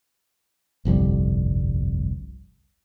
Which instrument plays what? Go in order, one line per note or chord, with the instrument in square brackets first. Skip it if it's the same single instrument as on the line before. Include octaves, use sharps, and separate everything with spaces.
[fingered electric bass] G1 C2 F2 G3